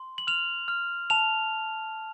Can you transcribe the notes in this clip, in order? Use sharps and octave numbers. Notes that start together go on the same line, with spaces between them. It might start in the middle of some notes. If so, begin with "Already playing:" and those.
Already playing: C6
F#7
F6 F7
F6
A5 F7